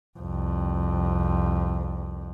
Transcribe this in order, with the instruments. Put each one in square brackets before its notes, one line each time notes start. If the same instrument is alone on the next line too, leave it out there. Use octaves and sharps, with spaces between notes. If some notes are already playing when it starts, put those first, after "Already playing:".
[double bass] C2 F2